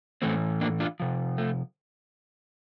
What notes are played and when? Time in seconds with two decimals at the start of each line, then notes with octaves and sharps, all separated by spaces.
0.22 A2 E3 A3 C4
0.61 A#3 D4
0.80 D4 F4
1.00 C3 F3
1.38 A3